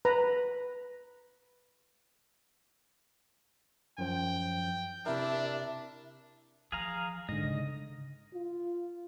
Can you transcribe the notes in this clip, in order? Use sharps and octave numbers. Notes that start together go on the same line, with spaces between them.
B4 A#5
F#2 F3 G5
C3 D4 E4 A#4 E5
E3 F3 G#4 F5 A#5
G#2 D3 D#5
C#3
F4